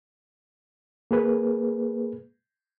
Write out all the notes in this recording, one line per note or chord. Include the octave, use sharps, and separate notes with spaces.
A#3 G#4 B4